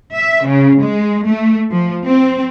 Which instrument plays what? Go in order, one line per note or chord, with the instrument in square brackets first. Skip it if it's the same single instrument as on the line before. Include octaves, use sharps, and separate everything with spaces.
[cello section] E5
C#3
G#3
A3
F3
C4